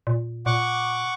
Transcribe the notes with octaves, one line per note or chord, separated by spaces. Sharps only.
A#2
A#2 F#5 C#6 D6